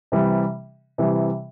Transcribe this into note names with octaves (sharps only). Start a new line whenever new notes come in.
C3 E3 G3
C3 E3 G3